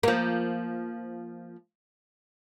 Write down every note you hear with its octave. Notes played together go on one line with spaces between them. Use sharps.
F3 A#3